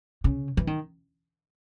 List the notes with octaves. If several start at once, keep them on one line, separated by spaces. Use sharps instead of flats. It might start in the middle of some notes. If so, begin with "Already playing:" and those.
C#3
E3
D#3